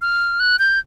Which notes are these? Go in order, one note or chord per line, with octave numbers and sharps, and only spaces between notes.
F6
F#6
G6